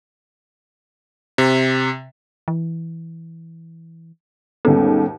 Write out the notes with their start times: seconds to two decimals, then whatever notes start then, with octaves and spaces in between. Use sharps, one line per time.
1.38 C3
2.48 E3
4.65 D#2 G#2 G3 B3 C#4 A4